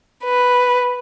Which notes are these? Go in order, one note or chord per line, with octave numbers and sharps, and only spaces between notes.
B4